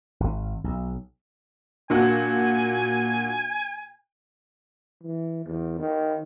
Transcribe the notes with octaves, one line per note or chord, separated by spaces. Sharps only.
G#1
B1
A#2 D4 F#4 G#5
E3
E2
D#3